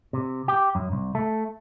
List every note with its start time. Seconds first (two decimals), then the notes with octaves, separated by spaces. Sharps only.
0.13 C3
0.48 G4
0.75 F#2
0.92 C2
1.15 A3